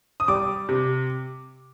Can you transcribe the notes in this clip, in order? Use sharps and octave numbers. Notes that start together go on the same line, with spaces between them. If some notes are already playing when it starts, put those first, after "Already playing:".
D#6
G3 D6
C3